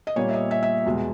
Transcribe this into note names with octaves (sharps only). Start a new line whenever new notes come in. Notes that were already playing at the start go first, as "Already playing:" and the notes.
D#5
A#2 G3 A#3 C#5
E5
D#5
E5
E5
E2 B2 G#3